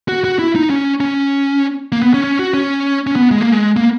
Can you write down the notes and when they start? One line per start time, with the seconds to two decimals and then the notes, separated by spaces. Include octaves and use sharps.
0.08 F#4
0.24 F#4
0.39 E4
0.56 D#4
0.70 C#4
1.00 C#4
1.92 A#3
2.02 B3
2.14 C#4
2.24 C#4
2.39 F#4
2.54 C#4
3.07 C#4
3.16 B3
3.31 G#3
3.41 A#3
3.52 G#3
3.77 A#3